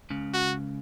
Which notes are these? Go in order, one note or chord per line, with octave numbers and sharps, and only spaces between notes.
C#2 C#3
F#4